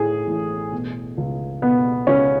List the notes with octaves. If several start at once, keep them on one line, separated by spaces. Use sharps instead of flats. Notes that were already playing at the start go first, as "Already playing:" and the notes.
Already playing: A2 G#4
A1
B2
C#2
B2 B3
C#2 C#4